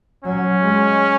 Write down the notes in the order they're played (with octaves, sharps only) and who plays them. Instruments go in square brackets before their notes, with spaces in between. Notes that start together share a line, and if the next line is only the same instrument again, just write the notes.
[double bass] F#3 [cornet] C#4
[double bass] G#3